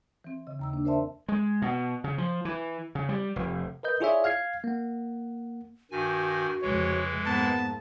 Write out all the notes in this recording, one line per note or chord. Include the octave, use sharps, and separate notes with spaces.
E3 C4
C#3 D#5
D#2 A#5 E6
A#3 D4
A#4 C5 D5 E5 A5 C6
G#3
B2
C#3
F3
E3
C#3
G3
F1
A#4 B4 D#5 G6
E4 F4 G#4 C#5 D5 E5
F5 F6 G#6 C7
A#3 F#5
G2 D#3 F#4 G#5
F1 C#2 E3 G#3 C#5
G#2 A#3 B3 A5